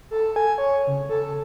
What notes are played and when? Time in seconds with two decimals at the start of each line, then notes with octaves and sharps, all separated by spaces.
0.11 A4
0.36 G#5
0.58 C#5
0.87 C#3
1.09 A4